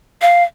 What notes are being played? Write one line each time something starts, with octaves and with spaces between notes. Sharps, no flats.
F5